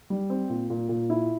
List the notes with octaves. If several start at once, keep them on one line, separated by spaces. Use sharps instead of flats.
G3
C4
A#2
A#2
A#2
E4